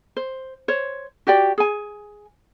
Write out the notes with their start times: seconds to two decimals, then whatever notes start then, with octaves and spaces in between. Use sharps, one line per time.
0.16 C5
0.68 C5 C#5
1.27 F#4 G4 D5 G5
1.58 G#4 G#5